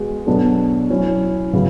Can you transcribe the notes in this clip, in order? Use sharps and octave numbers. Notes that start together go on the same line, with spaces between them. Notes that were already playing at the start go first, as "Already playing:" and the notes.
Already playing: G#3 B3 F#4
B2 F#3 B3 D4 A4
F#3 C#4 E4
C#3 F#3 B3 E4